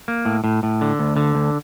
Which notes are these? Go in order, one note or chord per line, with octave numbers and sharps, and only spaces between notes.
A#3
A2
A2
A2
D3
D2
D3
D2